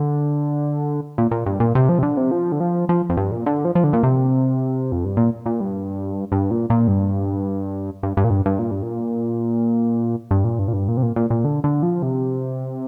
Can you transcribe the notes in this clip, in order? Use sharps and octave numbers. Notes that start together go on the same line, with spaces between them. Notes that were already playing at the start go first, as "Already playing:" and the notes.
Already playing: D3
A#2
A#2
G2
A#2
C3
F3
C3
D3
C3
F3
D3
F3
F3
F2
G2
A#2
D3
F3
F3
D3
A#2
C3
F2
G2
A#2
A#2
G2
G2
A#2
A#2
G2
G2
G2
A#2
G2
G2
A#2
G2
A#2
G2
A#2
G2
A#2
G2
A#2
C3
A#2
A#2
A#2
D3
D3
F3
C3